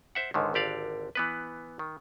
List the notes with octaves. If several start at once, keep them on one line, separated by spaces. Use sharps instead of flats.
C5 E5 F#5
C#2 G#2 D3 D#3
G#1 D3 G4 D5 F5
E3 B3 B4
D#3